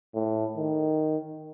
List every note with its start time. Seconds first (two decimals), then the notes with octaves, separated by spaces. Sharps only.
0.15 A2
0.57 D#3